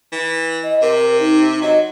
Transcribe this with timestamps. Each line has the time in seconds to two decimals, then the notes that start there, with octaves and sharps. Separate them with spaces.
0.12 E3
0.63 D#5
0.82 C3 A#4
1.20 D#4
1.62 F#3 D#5